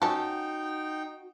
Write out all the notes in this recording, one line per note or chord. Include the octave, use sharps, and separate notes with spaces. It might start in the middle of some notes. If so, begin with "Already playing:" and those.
C#4 D#4 F#4 A4 G5